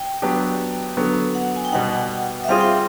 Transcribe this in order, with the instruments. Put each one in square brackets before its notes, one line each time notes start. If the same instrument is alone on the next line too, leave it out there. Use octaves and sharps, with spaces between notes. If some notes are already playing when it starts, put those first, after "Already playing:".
Already playing: [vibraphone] G5
[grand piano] F#3 B3 D4 G4
D3 F#3 B3
[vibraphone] F#5
G#5
G5
[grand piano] B2 G3 B3 D#4 [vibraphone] F#5
[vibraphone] E5
[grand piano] G3 C4 F4 G#4 [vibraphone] F5
[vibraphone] G5